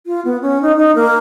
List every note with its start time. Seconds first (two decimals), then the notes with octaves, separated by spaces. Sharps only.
0.07 F4
0.25 B3
0.42 C#4
0.62 D#4
0.76 D#4
0.96 A#3